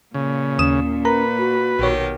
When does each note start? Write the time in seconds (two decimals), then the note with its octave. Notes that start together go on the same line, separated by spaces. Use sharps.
0.14 A#2 C#3
0.59 D#2 C#4 D#6 E7
1.05 A#4 B4 A#5
1.38 F#4
1.79 A#1 B2 D#3 G4 C#5